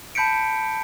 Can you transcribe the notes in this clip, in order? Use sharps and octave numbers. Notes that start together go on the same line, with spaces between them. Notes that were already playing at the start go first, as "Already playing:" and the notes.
A5 B5 G6 B6 C#7 D7